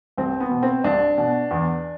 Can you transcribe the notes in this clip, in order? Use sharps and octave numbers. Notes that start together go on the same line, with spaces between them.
C2 C4
B3
B2
C4
C2 D4
B2
E2